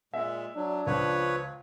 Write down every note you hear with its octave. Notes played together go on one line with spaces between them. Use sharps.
A#2 G#3 E5
F#3 D4
C#2 F3 B4 C#5